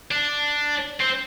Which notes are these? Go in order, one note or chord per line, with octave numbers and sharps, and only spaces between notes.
D4
C4